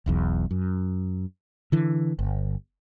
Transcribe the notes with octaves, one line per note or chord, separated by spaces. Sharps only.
E1 B1 E2
F#2
D3 E3
G1